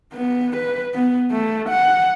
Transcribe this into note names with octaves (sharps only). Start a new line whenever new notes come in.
B3
B4
B3
A3
F#5